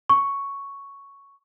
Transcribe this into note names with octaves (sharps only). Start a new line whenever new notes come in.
C#6